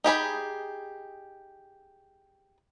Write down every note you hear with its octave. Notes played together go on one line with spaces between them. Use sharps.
D#4 G4 G#4 B5